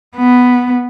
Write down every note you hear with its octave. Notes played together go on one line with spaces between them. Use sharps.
B3